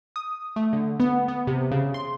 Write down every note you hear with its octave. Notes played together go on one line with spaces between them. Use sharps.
D#6
A3
D3
B3
B3
C3
C#3
C6